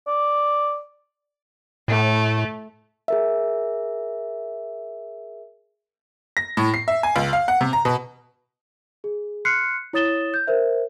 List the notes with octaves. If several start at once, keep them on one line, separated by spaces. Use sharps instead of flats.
D5
A2 A3
G#4 A#4 E5
A#6
A2
C7
E5
G#5
C#2
F5
F#5
C3
A#5
B2
G#4
C6 F6 F#6 C7 C#7
E4 C#5 D#6 A6 E7 G7
G6
A#4 C5 E5